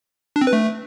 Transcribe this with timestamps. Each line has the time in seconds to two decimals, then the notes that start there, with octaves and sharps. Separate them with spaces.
0.36 D4
0.41 C4
0.47 B4
0.53 A3